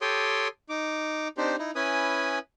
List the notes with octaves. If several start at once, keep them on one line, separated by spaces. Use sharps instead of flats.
G4 A4 C#5 G5 C6 D#6
D#4 D6
C4 D4 D#4 G4 C5
D#4 E4
C#4 E4 B4 G#5 D#6